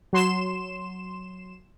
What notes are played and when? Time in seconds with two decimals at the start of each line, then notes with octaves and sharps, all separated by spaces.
0.13 F#3 C6 E7